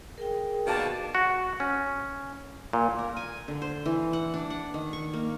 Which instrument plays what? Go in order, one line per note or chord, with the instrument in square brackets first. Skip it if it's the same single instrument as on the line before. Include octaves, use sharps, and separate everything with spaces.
[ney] G#4 [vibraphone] A#4 G5
[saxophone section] D#2 B2 A#3 [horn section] D5 A5
[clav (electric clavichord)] F#4
C#4
A#2
[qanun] A#4
G#5
D3
C5
E3
F#5
D4
F#5
D#3
C#6
A#3